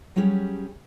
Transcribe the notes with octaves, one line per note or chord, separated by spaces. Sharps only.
F#3 G3 C#4 G4 G#4